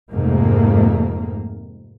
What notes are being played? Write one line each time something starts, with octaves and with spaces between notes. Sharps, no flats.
F2 G#2 C3 A3 A#3